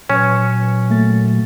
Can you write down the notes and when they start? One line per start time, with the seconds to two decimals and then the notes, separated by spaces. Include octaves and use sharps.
0.10 A#2 F#3 C#4 B4 C#7 E7
0.90 A3 A#3 A6